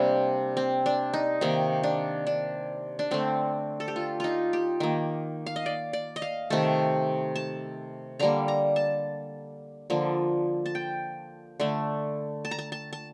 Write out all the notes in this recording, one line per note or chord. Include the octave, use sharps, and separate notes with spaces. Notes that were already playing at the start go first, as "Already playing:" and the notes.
Already playing: C3 G3 A#3 C4 D4
C4
D4
D#4
C3 D#3 A#3
D4
D4
D4
D3 A3 C4
A4
G4
F4
D#4 F4
G4
D#3 A#3
F5
D#5
D5
D5
D#5
F5
C3 D#3 A3 A5
A5
D3 G3 A#3 A#5
A#5
A5
D3 F3 A#3
A5
G5
D3 A3
A5
A#5
A5
A5
A5